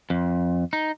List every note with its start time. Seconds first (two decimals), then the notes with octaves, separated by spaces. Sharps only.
0.10 F2
0.73 D#4